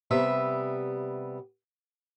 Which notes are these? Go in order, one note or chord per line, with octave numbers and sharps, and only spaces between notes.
C3 G3 B3 E5